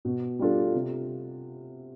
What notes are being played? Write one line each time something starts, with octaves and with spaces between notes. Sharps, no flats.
B2
G3 D4 F4 A4
C3